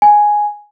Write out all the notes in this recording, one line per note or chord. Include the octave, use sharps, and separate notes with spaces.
G#5